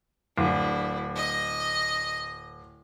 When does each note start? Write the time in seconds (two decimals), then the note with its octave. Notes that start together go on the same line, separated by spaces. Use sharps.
0.38 D1 D4 E4
1.16 D#5